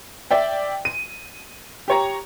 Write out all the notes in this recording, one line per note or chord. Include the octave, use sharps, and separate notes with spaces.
D5 E5 G5
D#7
G4 C#5 A#5